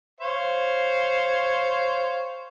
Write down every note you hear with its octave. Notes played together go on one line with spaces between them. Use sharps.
C5 C#5 F5